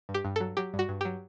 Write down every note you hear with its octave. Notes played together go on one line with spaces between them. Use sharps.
G2
G4
G2
F#3 A4
F#3 G4
G2
F#4
G2
F#3 G4